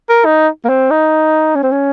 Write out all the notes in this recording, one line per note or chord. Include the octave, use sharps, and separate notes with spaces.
A#4
D#4
A#3
C4
D#4
C#4
C4
C#4